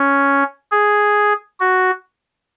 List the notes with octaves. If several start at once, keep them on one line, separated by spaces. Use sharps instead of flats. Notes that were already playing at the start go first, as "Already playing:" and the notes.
Already playing: C#4
G#4
F#4